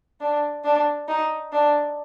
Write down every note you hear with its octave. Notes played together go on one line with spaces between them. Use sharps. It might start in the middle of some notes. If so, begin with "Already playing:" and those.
D4
D4
D#4
D4